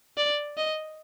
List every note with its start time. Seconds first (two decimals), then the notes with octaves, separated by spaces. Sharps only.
0.18 D5
0.57 D#5